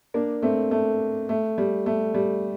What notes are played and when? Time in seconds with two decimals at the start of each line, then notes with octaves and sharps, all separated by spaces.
0.14 A#3 D4
0.42 A3 C4
0.71 A3
1.29 A3
1.58 G3
1.86 A3
2.14 G3